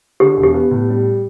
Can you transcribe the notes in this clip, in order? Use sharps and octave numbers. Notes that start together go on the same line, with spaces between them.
D3 G4
E1
G4
B3
A2
G3